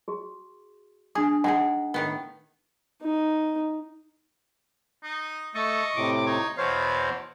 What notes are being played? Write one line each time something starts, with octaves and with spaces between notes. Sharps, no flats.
F#4 G#4
D4 G#4 D#6
G#3 D#4 G#4 F#5 G#5
A2 D#3 B3
D#4
D#4
A3 A4 D#5 C#6
A2 C3 D6
D#4 C#5
E2 B2 C5 C#5 F5